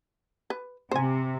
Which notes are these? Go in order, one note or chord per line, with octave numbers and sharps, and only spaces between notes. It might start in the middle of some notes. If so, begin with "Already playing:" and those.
B4
C3 C5 G#5